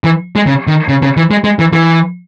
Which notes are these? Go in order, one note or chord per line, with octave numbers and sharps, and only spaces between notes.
E3
G#3
C#3
D#3
C#3
C#3
E3
G#3
G#3
E3
E3